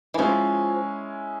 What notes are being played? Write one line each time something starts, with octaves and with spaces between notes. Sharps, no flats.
E3
F3 G#3 C#4 E4